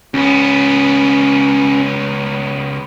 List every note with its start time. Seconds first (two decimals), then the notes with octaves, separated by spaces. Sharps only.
0.14 C#2 B3 C#4